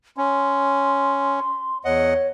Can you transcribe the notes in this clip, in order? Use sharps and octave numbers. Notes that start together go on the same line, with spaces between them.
C#4 C6
E2 C#5 D#5 F#5